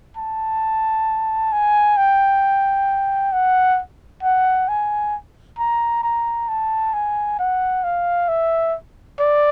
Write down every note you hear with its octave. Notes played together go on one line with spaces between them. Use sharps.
A5
G#5
G5
F#5
F#5
G#5
A#5
A#5
A5
G#5
F#5
F5
E5
D5